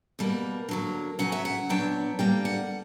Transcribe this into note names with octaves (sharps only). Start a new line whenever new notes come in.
B2 G3 A#3
D3 F#3 A#3
C#3 F#3 C#4 F#5
E5
F#5
A#2 F#3 B3 D4 G5
D3 G3 A#3 G5
F#5